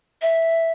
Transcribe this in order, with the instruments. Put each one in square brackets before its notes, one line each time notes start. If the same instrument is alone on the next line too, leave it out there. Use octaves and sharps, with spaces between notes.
[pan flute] E5